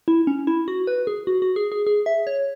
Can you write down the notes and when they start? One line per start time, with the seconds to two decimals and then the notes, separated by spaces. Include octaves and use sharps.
0.08 E4
0.27 C#4
0.47 E4
0.68 F#4
0.87 B4
1.07 G#4
1.27 F#4
1.42 F#4
1.56 G#4
1.72 G#4
1.87 G#4
2.06 E5
2.27 C#5